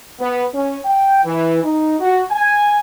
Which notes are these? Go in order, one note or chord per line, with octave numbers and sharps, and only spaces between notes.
B3
C#4
G5
E3
D#4
F#4
G#5